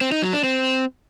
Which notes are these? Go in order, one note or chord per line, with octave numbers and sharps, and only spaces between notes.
C4
D#4
F#3
D4
C4